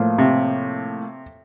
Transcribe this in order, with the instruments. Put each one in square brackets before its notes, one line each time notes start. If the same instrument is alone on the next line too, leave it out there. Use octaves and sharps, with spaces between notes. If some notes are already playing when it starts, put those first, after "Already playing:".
Already playing: [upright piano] A2 F3 A#3 F4
[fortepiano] C3